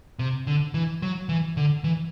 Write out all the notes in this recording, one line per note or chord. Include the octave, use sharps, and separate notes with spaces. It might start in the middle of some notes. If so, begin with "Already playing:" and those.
C3
D3
E3
F#3
E3
D3
E3